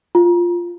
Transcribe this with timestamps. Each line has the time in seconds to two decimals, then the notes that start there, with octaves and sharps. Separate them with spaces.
0.15 F4